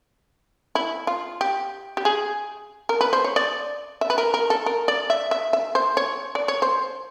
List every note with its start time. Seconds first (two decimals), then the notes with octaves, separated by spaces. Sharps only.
0.75 E4
1.07 F4
1.41 G4
1.97 G4
2.05 G#4
2.89 A#4
3.01 B4
3.13 C5
3.24 C#5
3.36 D5
4.01 E5
4.10 B4
4.18 A#4
4.34 A#4
4.50 A4
4.66 A#4
4.88 D5
5.10 E5
5.31 E5
5.53 E5
5.75 C5
5.97 C#5
6.35 D5
6.48 C#5
6.62 C5